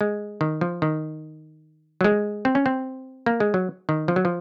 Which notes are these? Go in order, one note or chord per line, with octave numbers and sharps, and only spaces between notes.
G#3
D#3
F3
D#3
F#3
G#3
C4
C#4
C4
A#3
G#3
F#3
D#3
F3
F#3
F3